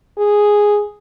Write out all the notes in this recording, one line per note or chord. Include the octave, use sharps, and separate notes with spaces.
G#4